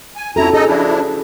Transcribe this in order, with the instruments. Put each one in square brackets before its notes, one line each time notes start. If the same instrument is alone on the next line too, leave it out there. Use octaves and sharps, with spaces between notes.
[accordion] G#5
[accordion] F2 E4 A#5 [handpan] C#4 F#4 A4
[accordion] D#4 A4 D#5 [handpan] G#4
[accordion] F3 D4 E4